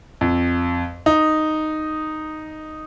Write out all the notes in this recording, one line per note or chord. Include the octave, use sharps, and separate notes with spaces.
F2
D#4